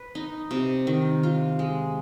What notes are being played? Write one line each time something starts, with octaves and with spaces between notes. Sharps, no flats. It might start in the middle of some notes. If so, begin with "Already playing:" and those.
Already playing: B4
D#4
C3
D#3
F4
G#3